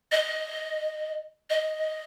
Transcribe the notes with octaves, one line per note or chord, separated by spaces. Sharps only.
D#5
D#5